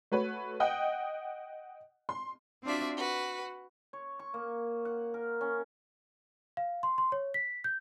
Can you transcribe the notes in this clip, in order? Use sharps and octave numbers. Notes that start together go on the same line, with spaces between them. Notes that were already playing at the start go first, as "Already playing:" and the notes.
A3 F#4 B4 C#5
D#5 F#5 G5 D#6
C6
C4 D4 F4 F#4 D5 E5
F#4 B4
C#5
C#6
A#3
F#5
A#4
C#4
F5
C6
C6
C#5
B6
G6